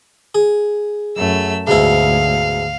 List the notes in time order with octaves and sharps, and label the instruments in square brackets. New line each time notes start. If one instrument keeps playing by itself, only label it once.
[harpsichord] G#4
[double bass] F#2 [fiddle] A3 E6
[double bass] D2 [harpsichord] G#2 B2 E4 [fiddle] F5